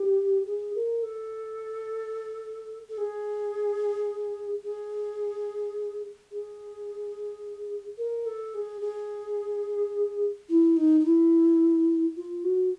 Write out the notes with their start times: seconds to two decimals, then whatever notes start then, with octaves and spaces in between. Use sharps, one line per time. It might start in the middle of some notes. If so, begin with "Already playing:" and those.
Already playing: G4
0.45 G#4
0.74 A#4
1.02 A4
2.89 A4
2.97 G#4
4.63 G#4
6.31 G#4
7.98 A#4
8.26 A4
8.54 G#4
8.81 G#4
10.48 E4
10.76 D#4
11.00 D#4
11.04 E4
12.16 F4
12.43 F#4